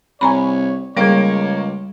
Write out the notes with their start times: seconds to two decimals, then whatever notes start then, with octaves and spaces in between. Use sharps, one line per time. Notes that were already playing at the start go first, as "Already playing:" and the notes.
0.21 C2 C#5 G#5 A#5 B5
0.97 C#2 G3 A#3 G#4 C#5 D7